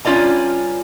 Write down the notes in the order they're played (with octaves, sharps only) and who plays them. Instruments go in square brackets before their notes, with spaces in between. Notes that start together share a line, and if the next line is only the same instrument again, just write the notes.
[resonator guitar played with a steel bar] G2 C#4 F4 D5 D#5 A#5